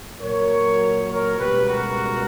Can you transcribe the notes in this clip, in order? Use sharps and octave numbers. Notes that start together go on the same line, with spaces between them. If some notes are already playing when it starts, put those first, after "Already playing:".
A#2 F#3 A#4 C#5
A#4 C#5
C#2 B2 G3 G4 B4
F#4 A#4